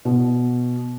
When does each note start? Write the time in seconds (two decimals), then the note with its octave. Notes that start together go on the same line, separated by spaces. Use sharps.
0.05 B2